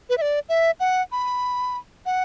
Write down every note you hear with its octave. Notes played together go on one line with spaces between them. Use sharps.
B4
E5
D5
E5
F#5
B5
F#5